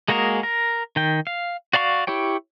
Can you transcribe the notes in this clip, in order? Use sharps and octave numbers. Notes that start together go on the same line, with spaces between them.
G#3 A#3 F#4 G#4 A#4
A#4
D#3 G5
F5
F#4 D5 F5 B5 C#6
E4 G4 C#5 G5